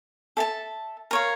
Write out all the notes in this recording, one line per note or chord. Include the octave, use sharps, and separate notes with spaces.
A4 E5 A5
A#4 C#5 F5